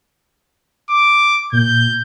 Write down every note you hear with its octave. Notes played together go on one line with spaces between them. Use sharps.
D6
A#2 G6